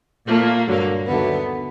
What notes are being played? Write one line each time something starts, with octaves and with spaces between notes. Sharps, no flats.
A#2 F3 A3 A#3
G2 D3 F#3 A#3
D#2 D3 F#3 A3 B3